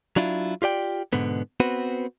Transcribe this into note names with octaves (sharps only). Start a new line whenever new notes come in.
F#3 D4 E4 F4
F4 G4 D5 G5
G#2 B2 D3 B3
B3 C4 F#4 B4